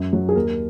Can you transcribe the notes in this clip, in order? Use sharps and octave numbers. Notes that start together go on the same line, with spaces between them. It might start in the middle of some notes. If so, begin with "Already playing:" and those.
Already playing: F#2
F#3
G#4
D#2 A#4